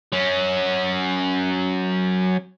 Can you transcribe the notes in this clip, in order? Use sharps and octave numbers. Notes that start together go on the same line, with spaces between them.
F#3 C#4